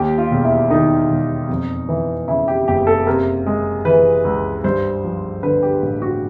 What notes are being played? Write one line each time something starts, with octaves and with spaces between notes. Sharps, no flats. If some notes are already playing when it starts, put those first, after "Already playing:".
Already playing: D#2 G4
F4
E1
E4
D#3 D#4
E1
F2
E3
C#3 E4
G4
F#1 G4
A4
C3 A#4
G#3
E3 B4
C#2
G2 C5
F3
D3 B4
G4
A1
F#4